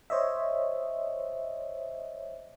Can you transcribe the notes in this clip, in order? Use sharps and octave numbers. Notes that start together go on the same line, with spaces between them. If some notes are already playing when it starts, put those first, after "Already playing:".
C5 C#5 D#5 E5